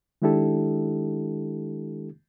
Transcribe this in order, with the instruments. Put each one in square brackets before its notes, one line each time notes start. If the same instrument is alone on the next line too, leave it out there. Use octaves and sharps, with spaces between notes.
[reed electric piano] D#3 G#3 D4 E4 G4 A4